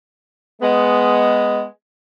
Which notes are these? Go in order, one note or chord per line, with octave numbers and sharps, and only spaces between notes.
G#3 B3